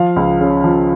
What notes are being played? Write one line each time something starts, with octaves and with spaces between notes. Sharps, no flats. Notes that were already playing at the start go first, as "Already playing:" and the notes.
Already playing: F3 F5
C#2
C#3
F3